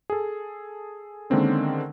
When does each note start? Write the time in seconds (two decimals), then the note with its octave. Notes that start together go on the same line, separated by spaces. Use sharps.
0.10 G#4 A4
1.30 D3 D#3 G#3 A#3 C4 C#4